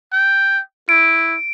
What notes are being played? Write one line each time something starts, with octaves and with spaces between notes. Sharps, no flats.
G5
E4 D7